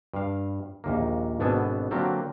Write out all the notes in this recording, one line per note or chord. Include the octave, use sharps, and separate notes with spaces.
G2 F5
A#1 D#2 A#3
G#1 B2 B3 D4 A4 G#5
D3 F#3 A#3 C4 G4 A4